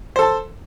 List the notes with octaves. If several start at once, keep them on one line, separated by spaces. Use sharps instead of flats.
A4 C5 A5